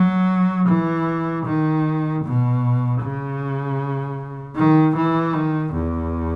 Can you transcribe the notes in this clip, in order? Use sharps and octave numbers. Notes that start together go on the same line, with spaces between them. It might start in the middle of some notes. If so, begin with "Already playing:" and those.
Already playing: F#3
E3
D#3
B2
C#3
D#3
E3
D#3
E2